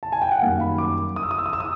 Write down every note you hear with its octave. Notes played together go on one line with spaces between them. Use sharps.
A5
G#5
G5
F#5
F#2 D#3 G3 A#3 F5
B5
D6
D#6
E6
D#6
E6
D#6
E6
D#6